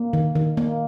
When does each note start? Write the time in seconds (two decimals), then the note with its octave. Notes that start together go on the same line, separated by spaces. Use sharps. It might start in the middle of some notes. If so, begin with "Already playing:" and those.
Already playing: A#3
0.13 D#3
0.35 D#3
0.57 A#3